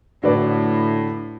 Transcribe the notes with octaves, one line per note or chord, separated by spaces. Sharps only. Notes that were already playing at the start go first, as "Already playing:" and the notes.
A2 D3 F#4 B4 D5